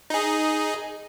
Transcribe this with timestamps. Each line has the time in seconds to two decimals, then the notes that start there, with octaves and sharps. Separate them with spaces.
0.10 D#4 G#4